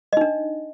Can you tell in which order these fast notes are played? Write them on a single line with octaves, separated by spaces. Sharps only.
D#5 D#4 D4